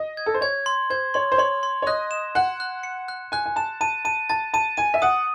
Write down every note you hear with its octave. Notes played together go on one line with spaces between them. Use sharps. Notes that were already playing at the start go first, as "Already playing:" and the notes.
Already playing: D#5
G#6
A4
C5
C#5 G#6
C6
C5 G#6
C#5 C6
C5
C#5 C6
C6
C#5
D#5 F#6
E7
F#5 F#6
F#6
C#7
F#6
G#5 F#6
G#5
A5 E7
A5 D#7
A5 D#7
A5 A6
A5 D#7
G#5 D#7
E5
F#5 D#6